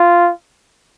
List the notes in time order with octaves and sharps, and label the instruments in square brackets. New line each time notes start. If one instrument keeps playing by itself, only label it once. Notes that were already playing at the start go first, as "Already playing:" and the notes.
Already playing: [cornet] F4